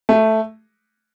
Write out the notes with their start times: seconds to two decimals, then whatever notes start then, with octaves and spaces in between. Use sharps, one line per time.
0.09 A3